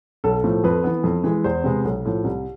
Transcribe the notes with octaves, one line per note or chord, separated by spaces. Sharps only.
B1 A4
A2 F3 A3
F2 B4
E3 B3
F2
E3 G#3
E2 C5
C3 G#3 B3
B1
A2 F3
C2